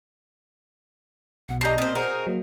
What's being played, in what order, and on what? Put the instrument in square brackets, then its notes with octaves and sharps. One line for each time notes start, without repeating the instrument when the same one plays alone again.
[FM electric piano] B1 B2 [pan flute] F#5
[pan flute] G4 [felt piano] D#5 G6 C7 [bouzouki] A5 A#5
[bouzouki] A#2 C5 [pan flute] C4 [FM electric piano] D#6
[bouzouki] F#4 G#4 A#4 [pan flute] C5
[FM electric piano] F#3 A#3